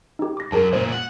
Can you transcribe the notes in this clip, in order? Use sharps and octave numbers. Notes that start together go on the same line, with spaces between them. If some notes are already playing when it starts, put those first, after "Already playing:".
D#4 G4
D6 A#6
F#2 G#4 A#4 A5
A#2 G#3 C5
F#5